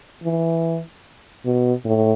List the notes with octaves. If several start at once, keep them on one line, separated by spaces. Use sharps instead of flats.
E3
B2
A2